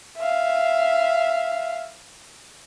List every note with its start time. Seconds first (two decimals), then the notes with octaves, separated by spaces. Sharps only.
0.18 E5 F5